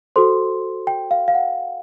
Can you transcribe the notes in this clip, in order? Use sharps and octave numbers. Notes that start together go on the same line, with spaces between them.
F#4 A4 C5 C6
G5
F5
F5
F#5